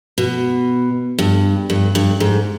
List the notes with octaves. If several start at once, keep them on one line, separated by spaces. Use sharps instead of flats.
B2
G2
G2
G2
G#2